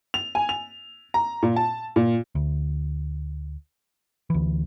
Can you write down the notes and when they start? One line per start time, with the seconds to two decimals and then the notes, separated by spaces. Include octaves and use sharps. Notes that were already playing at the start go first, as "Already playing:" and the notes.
0.14 F7
0.35 G#5
0.49 F7
1.14 A#5
1.43 A#2
1.56 A5
1.96 A#2
2.35 D2
4.30 D2 E3